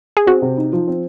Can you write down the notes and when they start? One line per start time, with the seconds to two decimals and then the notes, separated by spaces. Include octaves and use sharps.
0.17 G#4
0.27 C4 F#4
0.42 C3
0.57 D#4
0.73 F3
0.87 C4